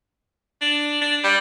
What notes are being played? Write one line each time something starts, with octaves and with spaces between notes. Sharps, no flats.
D4
D4
G3